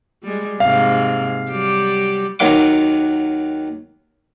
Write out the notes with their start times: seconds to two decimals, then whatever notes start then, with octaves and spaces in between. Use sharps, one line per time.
0.23 G3 G#3
0.60 G#2 C3 A#3 F5
1.51 F#3 G3 G4
2.39 D#2 D#3 F#3 F5 C6 D6